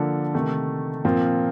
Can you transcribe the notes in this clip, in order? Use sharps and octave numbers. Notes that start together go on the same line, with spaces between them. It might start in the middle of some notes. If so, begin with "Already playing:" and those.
Already playing: D3 F3 A#3 D4 A4
C3 D#3 A3
A#2 F3 C4 F4 A#4